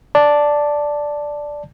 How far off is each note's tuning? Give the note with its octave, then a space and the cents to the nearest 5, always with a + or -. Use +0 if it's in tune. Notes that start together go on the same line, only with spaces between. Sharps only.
D5 +0 A5 +0